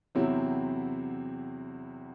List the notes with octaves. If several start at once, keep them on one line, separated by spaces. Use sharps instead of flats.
E2 C3 F#3 C4 E4